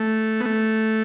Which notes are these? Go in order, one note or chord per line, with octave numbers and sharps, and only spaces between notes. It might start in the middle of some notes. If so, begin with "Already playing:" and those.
Already playing: A3
B3
A3